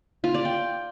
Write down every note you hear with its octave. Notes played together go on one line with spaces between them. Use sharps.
F4
D5
G5